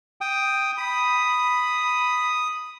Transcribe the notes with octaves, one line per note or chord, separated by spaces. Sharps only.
G5 D#6
B5 D#6